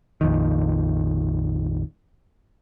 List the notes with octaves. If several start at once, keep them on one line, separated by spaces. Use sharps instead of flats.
A#1 F2 D#3